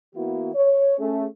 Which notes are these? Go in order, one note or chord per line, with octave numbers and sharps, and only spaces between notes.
E3 A#3 B3 E4 F#4
C#5
A3 C#4 G#4